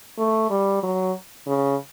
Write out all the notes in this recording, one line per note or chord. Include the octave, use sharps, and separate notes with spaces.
A3
G3
F#3
C#3